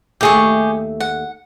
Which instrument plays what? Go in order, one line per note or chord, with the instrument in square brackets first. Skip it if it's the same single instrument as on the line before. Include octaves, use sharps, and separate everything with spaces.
[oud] D#2 A3 E5 [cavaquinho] G4 G#4 C#6
[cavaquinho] F#5